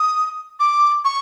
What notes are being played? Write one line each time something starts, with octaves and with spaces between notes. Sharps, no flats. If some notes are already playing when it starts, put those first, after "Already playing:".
Already playing: D#6
D6
C#6